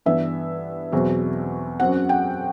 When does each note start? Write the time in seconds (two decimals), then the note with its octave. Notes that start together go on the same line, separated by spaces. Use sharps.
0.06 G2 E3 B3 E5
0.92 E2 B2 F#3 C4
1.80 F#2 F#3 C4 F#5
2.09 G5